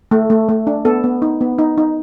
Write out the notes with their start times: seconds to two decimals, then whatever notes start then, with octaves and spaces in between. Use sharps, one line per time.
0.11 A3
0.30 A3
0.49 A3
0.67 D4
0.85 B3 A4
1.04 B3
1.22 D#4
1.41 B3
1.59 D#4
1.78 D#4